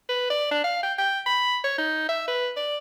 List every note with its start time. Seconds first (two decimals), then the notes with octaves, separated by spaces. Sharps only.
0.09 B4
0.30 D5
0.51 D4
0.64 F5
0.83 G5
0.98 G5
1.26 B5
1.64 C#5
1.78 D#4
2.09 E5
2.28 B4
2.57 D5